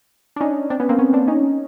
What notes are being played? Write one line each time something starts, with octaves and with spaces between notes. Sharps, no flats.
D4
C#4 D#4
C4 D4
B3 C#4
A#3 C4
B3 C#4
C4 D4
C#4 D#4